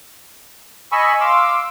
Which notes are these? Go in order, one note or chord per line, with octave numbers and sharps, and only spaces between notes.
D#5 G#5 B5 C#6 E6
F5 C6 D6 E6